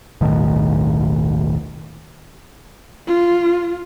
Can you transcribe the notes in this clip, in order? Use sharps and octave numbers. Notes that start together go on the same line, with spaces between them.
D#1 B1 A2 D#3
F4